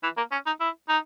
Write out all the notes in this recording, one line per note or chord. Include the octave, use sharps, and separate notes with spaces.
E3
A#3
C#4
D#4
E4
D#4